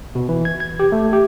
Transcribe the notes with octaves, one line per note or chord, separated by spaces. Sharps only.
B2
E3
G#6
G#6
G4
A3
G4